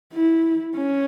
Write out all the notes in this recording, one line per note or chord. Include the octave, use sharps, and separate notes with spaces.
E4
C#4